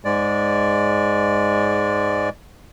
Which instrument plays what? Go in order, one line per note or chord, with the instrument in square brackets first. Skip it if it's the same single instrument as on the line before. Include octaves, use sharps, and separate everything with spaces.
[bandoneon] G#2 G#3 D5